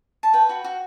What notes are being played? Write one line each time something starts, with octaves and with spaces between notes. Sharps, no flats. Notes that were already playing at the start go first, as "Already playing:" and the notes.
A5
B4 G5
F#4
F#4